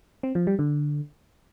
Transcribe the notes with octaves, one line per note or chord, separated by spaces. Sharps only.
C4
F3
G3
D3